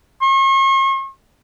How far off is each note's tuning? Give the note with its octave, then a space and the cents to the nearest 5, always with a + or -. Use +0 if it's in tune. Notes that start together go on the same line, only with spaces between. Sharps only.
C#6 -45